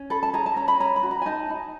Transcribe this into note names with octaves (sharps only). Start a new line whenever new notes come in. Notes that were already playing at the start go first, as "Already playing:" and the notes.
Already playing: C#4
A4 B5
A5
G#4 A#5
A5
C#4 A#5
B5
C#4 A#5
B5
F#4
A#5
G#5
D#4 A5
D#4